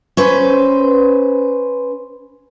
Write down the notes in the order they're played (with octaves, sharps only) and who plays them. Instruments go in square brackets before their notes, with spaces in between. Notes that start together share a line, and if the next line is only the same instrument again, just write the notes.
[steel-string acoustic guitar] C#4 B4 C5